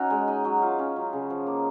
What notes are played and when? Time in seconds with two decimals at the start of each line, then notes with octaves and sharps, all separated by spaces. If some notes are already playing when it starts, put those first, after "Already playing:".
Already playing: C#4 D#4 F#4
0.10 G#3
0.28 D#4
0.45 F#3
0.62 F4
0.79 C#4
0.96 F#3
1.13 C#3
1.30 F3
1.47 A#3